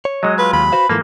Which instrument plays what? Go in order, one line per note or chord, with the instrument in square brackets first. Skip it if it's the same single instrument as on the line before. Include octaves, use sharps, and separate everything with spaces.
[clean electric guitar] C#5
[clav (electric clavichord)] F#3 G#3 [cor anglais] D#5
[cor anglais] F4 [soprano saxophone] B4
[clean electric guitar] D#2 [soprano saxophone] B5
[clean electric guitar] F#4 C5 F5 [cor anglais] B4
[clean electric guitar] G#2 E3 F3 [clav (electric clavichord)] A#3 [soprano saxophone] A4